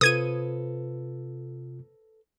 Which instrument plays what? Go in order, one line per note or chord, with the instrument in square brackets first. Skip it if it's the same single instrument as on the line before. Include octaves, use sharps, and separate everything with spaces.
[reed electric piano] C3 F4 [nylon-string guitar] A4 B4 C5 [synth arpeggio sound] D#6 G#6 D#7